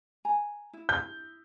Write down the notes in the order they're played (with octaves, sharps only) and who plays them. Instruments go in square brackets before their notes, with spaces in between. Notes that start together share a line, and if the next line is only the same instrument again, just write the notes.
[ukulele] G#5 A#5
E4
[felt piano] G6